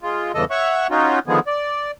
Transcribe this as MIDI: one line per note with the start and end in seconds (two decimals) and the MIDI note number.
0.02 0.32 56
0.02 0.32 65
0.34 0.45 40
0.34 0.45 43
0.34 0.45 49
0.34 0.45 52
0.34 0.45 69
0.34 0.45 75
0.51 0.87 73
0.51 0.87 76
0.51 0.87 78
0.51 0.87 85
0.91 1.19 61
0.91 1.19 63
0.91 1.19 65
0.91 1.19 66
1.27 1.39 50
1.27 1.39 51
1.27 1.39 53
1.27 1.39 56
1.27 1.39 59
1.27 1.39 68
1.47 1.91 74